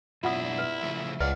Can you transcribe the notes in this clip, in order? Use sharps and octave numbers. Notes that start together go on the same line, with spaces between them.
F#2 B2 D4 E4 F4 F#5 D#6
B4
C#3 F3 A3
C#2 B4 D5 D#5 F5 F#5